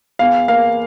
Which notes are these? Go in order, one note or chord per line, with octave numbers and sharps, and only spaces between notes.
E2 F5
A#3 F5